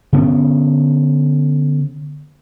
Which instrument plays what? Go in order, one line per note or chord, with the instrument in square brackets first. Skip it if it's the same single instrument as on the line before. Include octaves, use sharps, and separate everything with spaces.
[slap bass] D3 B3 C#4